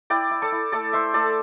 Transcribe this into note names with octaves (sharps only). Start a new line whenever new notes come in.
E4 D5 G5
E4
A4 D5
E4
A3 A4 D5
A3 C5 E5
A3 A4 D5